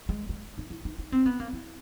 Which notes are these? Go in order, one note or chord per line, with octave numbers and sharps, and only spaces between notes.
G#3
G#3
D#4
E4
D#4
D#4
C4
B3
A#3
E4